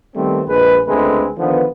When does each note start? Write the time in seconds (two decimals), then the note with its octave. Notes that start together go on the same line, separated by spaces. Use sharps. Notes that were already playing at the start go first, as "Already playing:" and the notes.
0.16 D#3 G3 A3 B3 C4
0.47 A#1 G#3 B4
0.88 C#2 D3 G#3 A3 C4 B4
1.38 D3 D#3 F3 B3